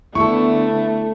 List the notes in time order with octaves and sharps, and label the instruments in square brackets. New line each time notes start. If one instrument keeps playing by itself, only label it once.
[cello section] D3 B3 [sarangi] A3 [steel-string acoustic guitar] E4 A4 [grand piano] C#6